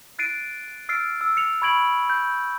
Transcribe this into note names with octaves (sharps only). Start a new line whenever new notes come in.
F#6 A6 C7 D7 D#7
E6 F6 A6 C7 D7
E6
C#7 F7
B5 C#6 G#6 D7 F#7
G6